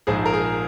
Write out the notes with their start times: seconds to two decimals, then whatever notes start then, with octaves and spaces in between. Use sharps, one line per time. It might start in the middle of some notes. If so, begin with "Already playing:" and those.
0.07 A#1 G#2 F3 G#4
0.26 A#4
0.33 G#4